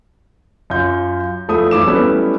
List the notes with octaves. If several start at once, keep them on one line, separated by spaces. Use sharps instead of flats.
F#2 F4 G6
E2 F3 A3 B5 D#6
G2 E3 E4 D6 E7
F#3 G3 A3 B3 C#4 E4